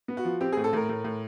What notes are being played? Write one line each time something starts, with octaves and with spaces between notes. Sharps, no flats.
B3
F#4
F3
C4 G4
G#4
A2
A4
A2 A#4
A2
A2